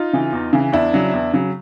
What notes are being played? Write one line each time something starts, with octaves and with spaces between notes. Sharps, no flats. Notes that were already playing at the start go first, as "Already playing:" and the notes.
Already playing: D#4 F4
C#3 E3
E2
C#3 E3
E2 D4 E4
C#3 F#3
E2
C#3 F#3